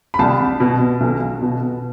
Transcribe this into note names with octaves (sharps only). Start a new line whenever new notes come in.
B5
C2 A5
B2
B1
B2